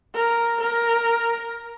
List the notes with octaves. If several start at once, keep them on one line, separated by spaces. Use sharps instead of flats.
A#4
A#4